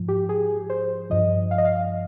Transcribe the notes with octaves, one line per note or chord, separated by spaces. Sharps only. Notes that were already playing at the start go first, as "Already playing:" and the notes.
Already playing: G#2 F3
G4
G#4
C5
G2 F3 D#5
F5
D#5
F5